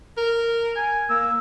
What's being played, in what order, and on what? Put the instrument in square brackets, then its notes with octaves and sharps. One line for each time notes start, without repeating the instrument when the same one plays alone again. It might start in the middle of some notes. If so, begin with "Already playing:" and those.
[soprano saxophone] A#4
[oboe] G#5
[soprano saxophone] A#3 [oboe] E6